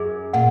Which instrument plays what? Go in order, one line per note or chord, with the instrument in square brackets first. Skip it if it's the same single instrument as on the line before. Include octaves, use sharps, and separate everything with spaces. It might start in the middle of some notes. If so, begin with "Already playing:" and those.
Already playing: [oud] F#2 [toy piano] G#4
[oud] A#2 [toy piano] F#5